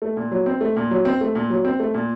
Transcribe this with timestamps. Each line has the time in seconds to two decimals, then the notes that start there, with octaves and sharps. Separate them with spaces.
0.02 A3
0.17 A#2
0.32 F#3
0.46 C4
0.61 A3
0.76 A#2
0.91 F#3
1.05 C4
1.21 A3
1.35 A#2
1.50 F#3
1.65 C4
1.80 A3
1.94 A#2